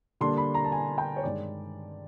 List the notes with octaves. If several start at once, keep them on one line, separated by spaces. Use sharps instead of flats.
D3 G3 A#3 D4 C6
B5
A#5
A5
G#5
G5
C#5
G2 D#3 G#3 D5